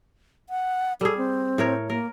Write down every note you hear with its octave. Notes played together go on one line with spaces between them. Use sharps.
F#5
G3 G#4 A4
C4
A2 A#4 C#5
A#3 A#4